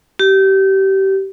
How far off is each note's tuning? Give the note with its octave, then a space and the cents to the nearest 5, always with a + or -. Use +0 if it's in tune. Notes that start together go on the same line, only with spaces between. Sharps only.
G4 -25